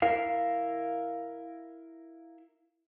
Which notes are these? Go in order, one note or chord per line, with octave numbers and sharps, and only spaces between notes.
E4 A#4 F5